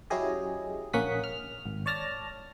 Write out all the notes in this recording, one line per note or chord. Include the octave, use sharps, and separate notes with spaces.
F#3 C#4 E4 G4 G#4 D#5
A#1 A#3 C#4 F#5 D#6 B6
F6
G#1
C#5 D5 A5 F6 A#6